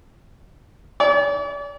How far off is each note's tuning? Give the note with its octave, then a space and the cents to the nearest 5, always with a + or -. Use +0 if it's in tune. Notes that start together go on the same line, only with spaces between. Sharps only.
D5 -40